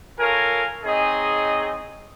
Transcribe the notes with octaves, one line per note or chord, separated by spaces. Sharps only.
F4 A4 A#4 C#5 F5 G#5
C4 D#4 G#4 C#5 D#5